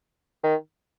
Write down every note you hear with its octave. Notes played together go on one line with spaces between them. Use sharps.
D#3